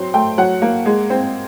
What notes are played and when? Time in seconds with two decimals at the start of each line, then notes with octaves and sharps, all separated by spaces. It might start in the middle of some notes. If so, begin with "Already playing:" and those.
Already playing: F#3 C4 C6
0.14 A3 G5
0.38 F#3 F#5
0.62 A#3
0.86 G#3
1.10 C4